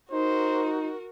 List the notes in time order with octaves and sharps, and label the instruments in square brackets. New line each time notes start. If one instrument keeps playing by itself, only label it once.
[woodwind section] D#4 [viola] F#4 A#4 [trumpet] C5